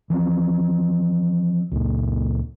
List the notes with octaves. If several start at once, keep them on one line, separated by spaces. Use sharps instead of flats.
E3 F3 A3 C4
C#2 A#2